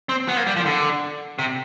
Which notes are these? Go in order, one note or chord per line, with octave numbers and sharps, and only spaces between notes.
C4
B3
A#3
G3
F3
D3
C3